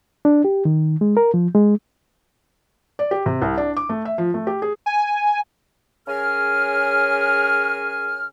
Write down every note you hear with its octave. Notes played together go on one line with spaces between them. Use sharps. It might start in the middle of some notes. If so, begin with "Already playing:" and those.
D4
G4
D#3
G#3
A#4
F3
G#3
D5
G4
C3
C2
D4
D6
A3
E5
F3
A3
G4
G#4
G#5
C#3 C#4 G#4 A#4 G#5 F6